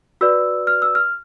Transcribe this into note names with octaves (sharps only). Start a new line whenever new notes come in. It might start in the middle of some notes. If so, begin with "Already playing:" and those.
F#4 B4 D5 E6
F6
E6
F6